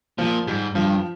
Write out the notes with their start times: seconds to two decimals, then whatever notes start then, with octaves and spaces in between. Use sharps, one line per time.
0.18 A#2 F3
0.47 G#2 G3
0.75 G2 F3